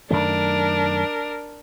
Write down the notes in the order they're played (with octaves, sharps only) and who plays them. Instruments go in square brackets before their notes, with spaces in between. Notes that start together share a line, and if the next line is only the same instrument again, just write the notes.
[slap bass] F#2 D#3 A3 [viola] D4 A#4